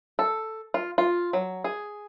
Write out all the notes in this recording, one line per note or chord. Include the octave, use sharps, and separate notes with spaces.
A4
F4
F4
F#3
G#4